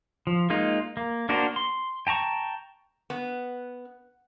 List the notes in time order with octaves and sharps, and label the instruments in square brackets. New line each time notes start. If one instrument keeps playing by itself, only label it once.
[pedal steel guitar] F3
G#3 A#3 D#4 F4
A#3
A#3 D4 F#4 A#4 C5
C6
G5 A5 A#5 C#6
[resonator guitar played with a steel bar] B3